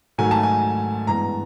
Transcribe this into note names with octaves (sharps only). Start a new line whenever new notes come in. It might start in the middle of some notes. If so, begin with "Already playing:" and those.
G#2 D#3 F#3 A3 G#5
A5
G#5
G2 E3 G#3 B3 A#5